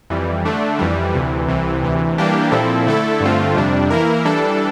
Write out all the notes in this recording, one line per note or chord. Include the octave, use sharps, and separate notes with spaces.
F2 E3 G3
D3 A3 D4
F2 E3 G3
D2 C3 E3
C2 C3 E3
D2 C3 E3
E3 G3 A#3 D4 G4
A#2 F3 C4 E4 A4
D3 A3 E4 A4
G2 D3 A3 C4 F4
F2 C3 G3 D4
E3 A#3 E4 A#4
E3 G3 D4 A4